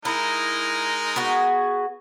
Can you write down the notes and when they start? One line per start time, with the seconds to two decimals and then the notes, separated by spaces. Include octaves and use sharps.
0.05 G#3 D#4 E4 A#4
1.16 B3 F#4 G#4